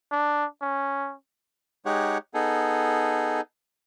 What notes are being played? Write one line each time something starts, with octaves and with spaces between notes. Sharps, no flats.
D4
C#4
G#3 D#4 G4 C#5 F#5
B3 D#4 G#4 A4